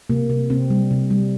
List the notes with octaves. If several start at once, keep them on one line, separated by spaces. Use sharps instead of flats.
C3 A#3
C3
C3 C4
G3
C3
G3